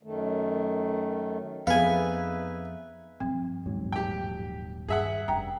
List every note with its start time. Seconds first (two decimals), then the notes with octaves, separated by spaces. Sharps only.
0.03 F#2 D#3 A3
1.67 F2 B3 D#4 G#4 B4 E5 F5 G#5
3.20 G2 F3 C4
3.66 D#1 G#2 F#3
3.92 G4 G5
4.89 G2 G#4 E5 F#5
5.28 F1 G2 C#4 G5 A#5